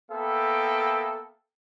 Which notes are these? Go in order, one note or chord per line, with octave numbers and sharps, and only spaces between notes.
A#3 B3 A4 E5 G5